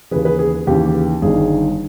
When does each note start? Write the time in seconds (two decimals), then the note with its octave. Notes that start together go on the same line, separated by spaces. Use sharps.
0.11 D#2 C#3 E3 G#4 B4
0.25 G#4 B4
0.39 G#4
0.67 D#2 C#3 E3 G4
1.22 G1 G2 D#3 G#4